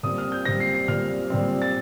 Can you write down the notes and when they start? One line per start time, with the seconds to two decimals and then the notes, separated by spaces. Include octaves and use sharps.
0.03 A#2 G3 C4 D#6
0.18 F6
0.32 G6
0.45 A#2 G3 C4 A#6
0.60 C7
0.74 C7
0.88 A#2 G3 C4 F6
1.30 A#2 G3 C4
1.62 A6